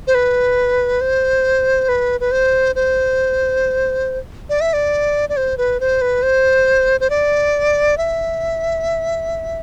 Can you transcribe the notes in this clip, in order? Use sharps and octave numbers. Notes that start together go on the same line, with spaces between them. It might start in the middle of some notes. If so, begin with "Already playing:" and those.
C5
B4
C5
B4
B4
C5
C5
D5
E5
D5
D5
C5
B4
C5
B4
C5
C5
D5
E5